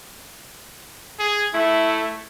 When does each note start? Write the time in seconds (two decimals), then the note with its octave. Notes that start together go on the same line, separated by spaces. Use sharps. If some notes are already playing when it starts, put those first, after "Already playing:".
1.19 G#4
1.54 A3 E4